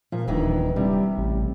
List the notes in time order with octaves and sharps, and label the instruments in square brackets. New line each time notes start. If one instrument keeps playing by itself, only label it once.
[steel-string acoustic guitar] A#2 [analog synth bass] F3
[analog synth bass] D#1 [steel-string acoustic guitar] D2 D#3 E3
[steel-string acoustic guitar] C3 [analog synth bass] G3
[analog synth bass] A1